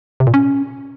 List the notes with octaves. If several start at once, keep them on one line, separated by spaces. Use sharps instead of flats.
C3
A#2
C#4